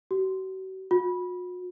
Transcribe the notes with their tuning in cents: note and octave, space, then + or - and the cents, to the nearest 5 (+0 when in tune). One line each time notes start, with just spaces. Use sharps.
F#4 +40
F#4 -45